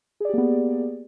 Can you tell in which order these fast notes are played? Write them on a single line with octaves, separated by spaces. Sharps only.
G#4 D5 G4 A#3 B3